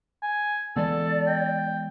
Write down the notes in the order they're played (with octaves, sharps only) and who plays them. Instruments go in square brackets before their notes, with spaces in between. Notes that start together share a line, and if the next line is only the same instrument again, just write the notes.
[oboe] G#5
[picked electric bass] E3 G#3 B3 [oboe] A4 [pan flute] D5
[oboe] G5